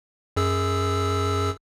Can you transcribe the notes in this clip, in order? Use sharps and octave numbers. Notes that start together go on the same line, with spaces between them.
F#2 G#4 E6